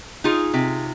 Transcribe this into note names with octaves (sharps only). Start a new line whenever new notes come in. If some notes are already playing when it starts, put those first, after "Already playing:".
D#4 F4 G#4
C3